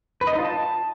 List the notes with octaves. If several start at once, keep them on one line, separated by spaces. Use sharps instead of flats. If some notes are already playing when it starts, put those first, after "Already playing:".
B4
D#5
D#4
F4
A5